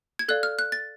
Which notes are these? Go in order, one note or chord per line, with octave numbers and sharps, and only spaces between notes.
G#6
A4 D5 F5 F#6
F6
F#6
A6